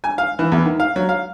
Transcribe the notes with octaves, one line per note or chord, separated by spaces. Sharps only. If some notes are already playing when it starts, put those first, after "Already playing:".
G#5
F5
E3
E2
D#3
F5
F#3
F5